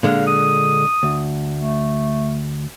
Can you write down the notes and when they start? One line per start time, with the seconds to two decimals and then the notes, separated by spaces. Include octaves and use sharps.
0.03 A#2 D3 G#3 F5
0.27 D#6
1.03 D2
1.53 A3